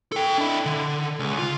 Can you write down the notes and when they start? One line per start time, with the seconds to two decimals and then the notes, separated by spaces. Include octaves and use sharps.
0.12 A4 G5
0.38 D4 E4
0.65 D3
1.19 C#2
1.39 F4